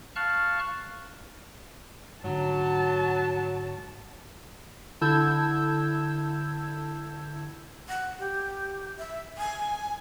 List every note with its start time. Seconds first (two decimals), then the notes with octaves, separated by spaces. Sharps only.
0.16 F5 A5 C#6 F6 F#6
2.24 G#2 D3 F#3 A5
5.01 D3 E4 A5 E6 G6 G#6
7.88 F#5
8.19 G4
8.99 E5
9.38 G#5